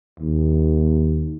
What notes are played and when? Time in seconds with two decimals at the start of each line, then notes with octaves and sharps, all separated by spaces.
0.20 D#2